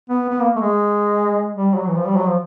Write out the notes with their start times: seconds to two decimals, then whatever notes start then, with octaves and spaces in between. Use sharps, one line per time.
0.10 B3
0.30 B3
0.40 A#3
0.56 A3
0.61 G#3
1.54 G3
1.75 F#3
1.88 E3
1.95 F3
2.06 G3
2.16 F#3
2.26 F3